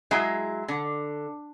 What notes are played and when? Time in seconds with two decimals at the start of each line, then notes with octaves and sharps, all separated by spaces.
0.11 F#3 G#3 E4
0.68 D3